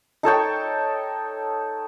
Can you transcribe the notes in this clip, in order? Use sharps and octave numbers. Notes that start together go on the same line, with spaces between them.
D#4 A4 C#5 G5